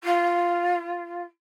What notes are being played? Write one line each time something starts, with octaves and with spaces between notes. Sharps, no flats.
F4